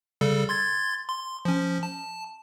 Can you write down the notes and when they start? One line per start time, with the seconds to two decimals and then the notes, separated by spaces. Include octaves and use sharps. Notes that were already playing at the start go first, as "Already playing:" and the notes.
0.21 C#3 G3 A4
0.49 C6 G#6 A6
1.09 C6
1.45 F3 C#4
1.83 A5